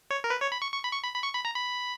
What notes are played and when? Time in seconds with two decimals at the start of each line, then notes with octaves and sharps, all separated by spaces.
0.10 C#5
0.24 A#4
0.30 B4
0.42 C#5
0.52 B5
0.62 C#6
0.73 C#6
0.83 B5
0.93 C#6
1.03 B5
1.14 B5
1.24 C#6
1.35 B5
1.45 A#5
1.56 B5